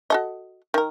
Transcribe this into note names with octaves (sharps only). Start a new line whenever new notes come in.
F#4 A4 D#5
D#3 A#4